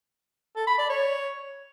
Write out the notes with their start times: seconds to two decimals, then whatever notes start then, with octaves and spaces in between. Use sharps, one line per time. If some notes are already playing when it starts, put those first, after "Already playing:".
0.56 A4
0.67 B5
0.78 D5
0.89 C#5